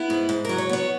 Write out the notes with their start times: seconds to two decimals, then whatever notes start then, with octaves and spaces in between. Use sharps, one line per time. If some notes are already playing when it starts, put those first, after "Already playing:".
Already playing: B3 E4
0.10 G#2
0.29 G#2
0.45 F#3 A#4
0.58 C#5
0.69 B3 C#5